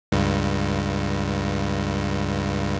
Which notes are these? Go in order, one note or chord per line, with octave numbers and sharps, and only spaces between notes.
C#2 G2